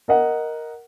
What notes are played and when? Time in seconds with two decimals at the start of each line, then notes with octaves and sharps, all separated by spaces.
0.08 A#4 D#5 F#5